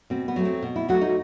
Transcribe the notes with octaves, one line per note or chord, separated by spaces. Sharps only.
B2 C4
B3
F#3 A3
C4
B2
E4
F#3 A3 F#4
D#4